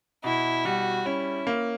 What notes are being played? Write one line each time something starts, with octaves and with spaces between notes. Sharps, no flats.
B2 E4
G3 F#4
C#4 E4
A#3